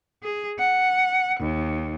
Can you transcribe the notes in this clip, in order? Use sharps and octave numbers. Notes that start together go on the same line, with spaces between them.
G#4
F#5
D#2